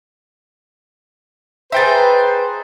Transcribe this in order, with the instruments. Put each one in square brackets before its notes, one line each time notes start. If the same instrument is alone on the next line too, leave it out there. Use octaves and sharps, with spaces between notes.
[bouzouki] D#4 G#4 [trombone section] B4 [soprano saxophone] C5 [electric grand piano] E5 G5 A6